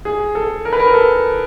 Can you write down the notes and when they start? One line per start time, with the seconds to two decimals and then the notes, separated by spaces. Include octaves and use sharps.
0.05 G#4
0.35 A4
0.65 A#4
0.73 B4
0.79 A#4
0.94 A4